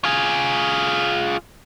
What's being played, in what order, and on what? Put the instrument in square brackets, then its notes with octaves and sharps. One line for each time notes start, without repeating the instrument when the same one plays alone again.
[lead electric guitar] F4 G#4